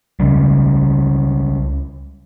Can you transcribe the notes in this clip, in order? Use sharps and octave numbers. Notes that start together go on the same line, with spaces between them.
C#2 C#3 G3